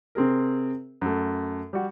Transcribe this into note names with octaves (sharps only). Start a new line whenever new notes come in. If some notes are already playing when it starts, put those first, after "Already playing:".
C3 C4 G#4 A#4
F#2 A3
G3 F#4